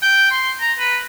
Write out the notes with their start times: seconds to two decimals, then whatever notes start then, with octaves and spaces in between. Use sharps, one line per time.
0.02 G5
0.31 C6
0.61 A#5
0.79 B4